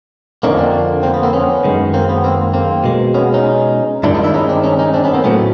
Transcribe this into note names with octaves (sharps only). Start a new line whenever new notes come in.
F2 D3 F3 A#3 C#4 D#4
C4 D4
A#3 C4
B3
A#3 C4
B3 C#4
F#2 D#3 G#3
A#3 C4
B3
A#3 C4
A#3 C4
B2 G#3
B3 C#4
C#4 D#4
G2 D#3 G#3 D4 E4
D#4 F4
D4 E4
C#4 D#4
C4 D4
C#4 D#4
C#4 D#4
C4 D4
B3 C#4
A#3 C4
A2 F#3 A3 B3 C#4